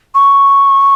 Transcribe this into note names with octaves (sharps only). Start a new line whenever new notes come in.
C#6